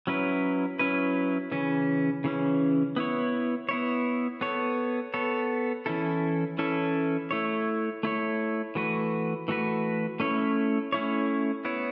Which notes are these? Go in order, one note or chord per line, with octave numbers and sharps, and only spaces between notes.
F#3 C#4 E4 B4
F#3 C#4 E4 B4
C#3 E3 C#4
C#3 E3 C#4
B3 E4 C#5
B3 E4 C#5
B3 A4 C#5
B3 A4 C#5
E3 C#4 E4 A4
E3 C#4 E4 A4
A3 E4 C#5
A3 E4 C#5
E3 A3 F#4 B4
E3 A3 F#4 B4
A3 C#4 E4 C#5
A3 C#4 E4 C#5
B3 E4 C#5